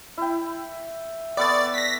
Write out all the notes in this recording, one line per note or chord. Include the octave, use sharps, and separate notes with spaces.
E4 G5
B3 A4 D5 C#6 A6
A#6 B6